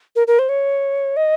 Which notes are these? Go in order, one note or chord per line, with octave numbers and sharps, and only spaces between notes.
A#4
A#4
C5
C#5
D#5